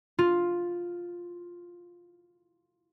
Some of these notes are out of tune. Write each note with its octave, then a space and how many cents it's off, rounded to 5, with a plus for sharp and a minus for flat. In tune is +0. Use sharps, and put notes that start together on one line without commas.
F4 +5